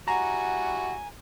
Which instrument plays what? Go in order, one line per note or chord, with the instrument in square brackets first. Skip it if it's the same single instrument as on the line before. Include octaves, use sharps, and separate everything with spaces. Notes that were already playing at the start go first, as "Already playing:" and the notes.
[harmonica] G3 E4 F#4 [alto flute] F#5 [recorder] G#5 [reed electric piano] A#5